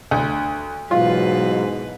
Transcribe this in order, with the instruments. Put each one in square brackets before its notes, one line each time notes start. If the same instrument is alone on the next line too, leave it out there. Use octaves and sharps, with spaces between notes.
[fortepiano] D2
[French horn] G#2 [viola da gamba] B2 E3 B4 [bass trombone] F#3 [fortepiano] F4